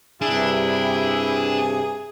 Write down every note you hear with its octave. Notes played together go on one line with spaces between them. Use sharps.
G2 C3 G3 D4 E4 G#4